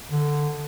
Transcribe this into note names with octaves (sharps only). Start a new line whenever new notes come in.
D3